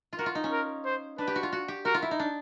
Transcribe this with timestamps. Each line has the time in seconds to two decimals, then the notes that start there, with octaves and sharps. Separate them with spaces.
0.13 F4
0.19 F#4 A#4
0.26 F4
0.35 D#4
0.44 C#4
0.52 A#4
0.85 C5
1.18 D4 B4
1.27 G4
1.35 F#4
1.43 F4
1.52 F#4
1.68 G4
1.85 F#4 A#4
1.94 F4
2.02 E4
2.11 D#4
2.19 D4